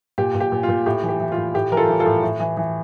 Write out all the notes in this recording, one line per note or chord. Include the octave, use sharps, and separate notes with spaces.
A#2 G4
A#2
G4
A#2
F4
A#2
A2 G4
E3
G4
E3
F4
A2
A2 G4
E3 A#4
F4 A4
E3
F4 A4
A2
A2
E3
E3